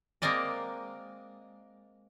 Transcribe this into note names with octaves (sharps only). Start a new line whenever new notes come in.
G#3 A#3 C4 A#4 D5 D#5